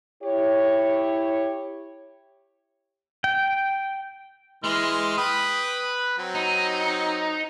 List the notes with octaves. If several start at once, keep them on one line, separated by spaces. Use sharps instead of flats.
E4 G4 C#5
G5
E3 G#3 C6 F6
B4 G5 B5 D#6
F#3 C4
D#4